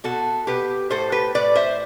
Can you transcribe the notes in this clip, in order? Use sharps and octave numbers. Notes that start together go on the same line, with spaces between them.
B2 F#4 A4
B2 G4 B4
A2 A4 C5
G4 B4
A2 B4 D5
C5 E5